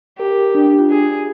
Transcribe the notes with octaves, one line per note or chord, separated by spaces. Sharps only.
G4 A#4
D4
D4
F4
G#4